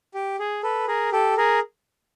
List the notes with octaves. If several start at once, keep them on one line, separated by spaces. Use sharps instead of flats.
G4
G#4
A4 B4
G#4 A#4
G4 A4
G#4 A#4